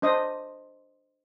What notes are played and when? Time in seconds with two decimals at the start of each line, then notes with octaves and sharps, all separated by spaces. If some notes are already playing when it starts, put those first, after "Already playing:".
0.02 D4 C5 D#5 D#6